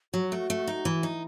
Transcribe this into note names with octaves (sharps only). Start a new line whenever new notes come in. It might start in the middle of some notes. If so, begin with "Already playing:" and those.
F#3 F#4
A3
A3
D#4
E3
D#4